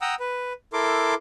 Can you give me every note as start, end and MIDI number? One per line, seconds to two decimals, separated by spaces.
0.01 0.15 78
0.01 0.15 79
0.01 0.15 82
0.01 0.15 87
0.01 0.15 88
0.20 0.53 71
0.73 1.14 64
0.73 1.14 69
0.73 1.14 70
0.73 1.14 84
0.73 1.14 86